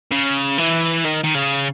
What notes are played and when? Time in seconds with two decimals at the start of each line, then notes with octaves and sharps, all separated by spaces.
0.11 C#3
0.58 E3
1.05 D#3
1.24 D#3
1.35 C#3